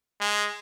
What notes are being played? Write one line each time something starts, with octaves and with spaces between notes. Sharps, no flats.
G#3